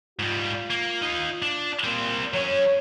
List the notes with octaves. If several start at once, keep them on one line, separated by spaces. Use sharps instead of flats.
G#2 G3 F4
A#3
D#4 F5
D4
A#2 G3 C4
F#3 C#4 C#5